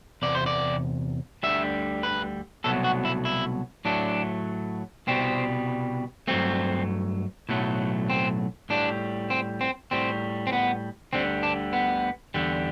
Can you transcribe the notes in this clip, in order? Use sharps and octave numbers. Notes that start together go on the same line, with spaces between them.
E2 C3 D5
C5
D5
D2 D3 G3 E5
B4
C2 B2 F#3 A3 A4
F#4
E4
E4
A2 F#3 A3 D4
C2 B2 G3 C4
G2 F#3 A3 C4
B1 A2 F#3 A3
C4
A2 G3 D4
C4
C4
A2 G3 C4
C4
B3
D2 D3 G3 C4
D4
B3
E2 D3 G3